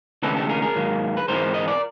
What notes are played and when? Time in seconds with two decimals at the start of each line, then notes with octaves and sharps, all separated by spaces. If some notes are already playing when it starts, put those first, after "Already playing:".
0.23 D2 C3 E3 G#3 C#4 A4 B4
0.36 G4 A4
0.49 G#4 A#4
0.62 G#4 A#4
0.75 G#2 D#3 F#3 A#3
1.17 B4
1.28 G#2 E3 G#3 C4 A#4 C5
1.54 D#5
1.68 D5